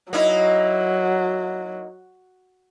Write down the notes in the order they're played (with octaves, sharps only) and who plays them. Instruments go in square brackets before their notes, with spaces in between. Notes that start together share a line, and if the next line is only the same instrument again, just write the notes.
[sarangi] F#3 [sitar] A#3 D#4 E4